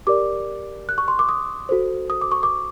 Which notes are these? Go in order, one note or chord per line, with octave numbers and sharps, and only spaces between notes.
G4 A#4 D5 D6
F#6
C#6
C6
D6
D#6
F#4 A4 C5
D#6
D6
C#6
D6